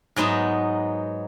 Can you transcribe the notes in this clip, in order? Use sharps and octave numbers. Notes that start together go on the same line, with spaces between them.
G#2 F#3 B3 D#4 A5